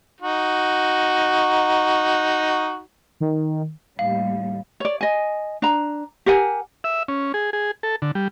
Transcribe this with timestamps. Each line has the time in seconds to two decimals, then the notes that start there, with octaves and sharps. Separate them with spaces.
0.21 D#4 F#4
3.20 D#3
3.99 D#2 A2 G3 F5
4.80 C#5 D5
5.01 D#5 G#5
5.62 D4 A#5
6.26 G4 A#4 F#5 G#5
6.84 E5
7.08 C#4
7.34 G#4
7.53 G#4
7.83 A4
8.02 D3
8.15 G3